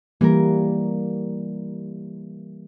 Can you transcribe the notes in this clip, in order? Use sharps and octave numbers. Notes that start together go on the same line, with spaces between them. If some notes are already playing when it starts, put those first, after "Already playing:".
E3 G3 A#3 A#4